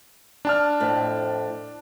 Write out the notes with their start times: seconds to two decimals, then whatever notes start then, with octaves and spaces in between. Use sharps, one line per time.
0.45 D4 A5 F6
0.80 F2 A2 C4